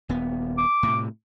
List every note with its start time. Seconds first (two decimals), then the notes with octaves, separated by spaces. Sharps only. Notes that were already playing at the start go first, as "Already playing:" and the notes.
0.09 D#1 B3
0.58 D6
0.83 A2 C3